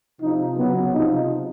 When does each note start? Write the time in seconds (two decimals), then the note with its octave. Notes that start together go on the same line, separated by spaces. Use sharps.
0.21 C3 F3 D#4
0.58 C#3 F#3 B3
0.94 C3 F3 D#4